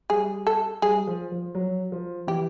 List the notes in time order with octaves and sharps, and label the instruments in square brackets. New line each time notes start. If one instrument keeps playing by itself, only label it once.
[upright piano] G3 [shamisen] G#4
[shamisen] A4
[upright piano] G3 [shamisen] G#4
[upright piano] F3
F3
F#3
F3
[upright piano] E3 [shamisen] G4